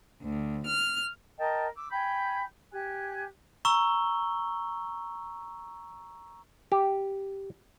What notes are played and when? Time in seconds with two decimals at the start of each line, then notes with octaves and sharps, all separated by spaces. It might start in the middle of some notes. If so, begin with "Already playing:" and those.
0.21 D2
0.66 F6
1.38 A#4 D#5 G5 A5
1.74 D6 E6
1.90 G5 G#5 B5 G6
2.71 G4 G#5 F#6
3.65 A#5 C#6 E6 G7
6.72 G4